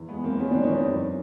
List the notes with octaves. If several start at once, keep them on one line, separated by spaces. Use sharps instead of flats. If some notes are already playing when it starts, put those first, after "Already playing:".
Already playing: E2
G#3 B3
E2 A#3 C4
G#3 B3 C#4
C4 D4
E2
C#4 D#4
E2
F#2